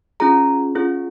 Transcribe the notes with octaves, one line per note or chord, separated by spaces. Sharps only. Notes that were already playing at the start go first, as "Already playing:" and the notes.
C#4 F4 G#4 A#5
C#4 F4 G#4